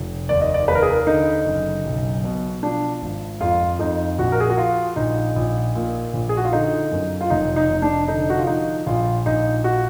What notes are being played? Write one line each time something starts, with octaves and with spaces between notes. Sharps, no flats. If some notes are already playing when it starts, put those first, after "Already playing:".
Already playing: F1
D#2 D5
D#5
D5
D#2 B4
A#4
G#4
A#4
D3 D#4
F#1
B1
B2
F3 D4
G#1
F2 F4
F2 D#4
A#1 F#4
A#4
G#4
F#4
F3 F4
A#1 D#4
A#1
A#2
A#1
G#4
F#4
F4
D3 D#4
F#2
F4
F1 D#4
D#4
F1
D4
D3 D#4
F#4
F4
F3 D#4
A#1 F4
A#1 D#4
F3 F#4